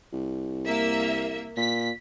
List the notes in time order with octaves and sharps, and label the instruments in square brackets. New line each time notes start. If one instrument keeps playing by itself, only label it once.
[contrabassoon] C2
[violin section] A#3 E5
[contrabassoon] A#2 [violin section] B6